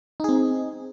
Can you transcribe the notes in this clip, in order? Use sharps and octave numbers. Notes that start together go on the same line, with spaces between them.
C4 D#4 G#4